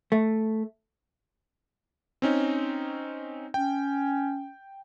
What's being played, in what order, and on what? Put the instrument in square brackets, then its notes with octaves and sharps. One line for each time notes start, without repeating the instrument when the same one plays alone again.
[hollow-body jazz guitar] A3
[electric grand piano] C4 C#4 D#4
[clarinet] C#4 [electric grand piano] G5